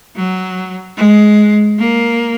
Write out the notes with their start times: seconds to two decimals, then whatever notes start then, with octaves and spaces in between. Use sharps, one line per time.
0.16 F#3
0.97 G#3
1.78 A#3